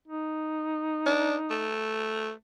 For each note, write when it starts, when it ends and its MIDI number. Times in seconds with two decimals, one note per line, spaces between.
0.08 1.71 63
1.06 1.36 62
1.50 2.31 57